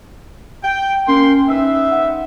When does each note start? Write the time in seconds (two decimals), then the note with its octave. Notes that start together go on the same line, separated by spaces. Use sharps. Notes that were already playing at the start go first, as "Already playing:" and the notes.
0.63 G5
1.08 A#3 C#4 G5 C6
1.48 D#4 B4 E5
1.91 F#5